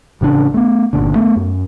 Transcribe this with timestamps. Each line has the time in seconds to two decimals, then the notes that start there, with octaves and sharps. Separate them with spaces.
0.21 A1 C#3 E3 D4
0.54 A3 B3
0.93 G1 C2 A#2 D3
1.15 A3 B3
1.36 F#2